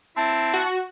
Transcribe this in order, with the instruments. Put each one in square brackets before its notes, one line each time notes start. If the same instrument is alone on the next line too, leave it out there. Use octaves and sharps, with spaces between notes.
[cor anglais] C4 [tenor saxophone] E4 [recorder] A5
[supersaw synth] F#4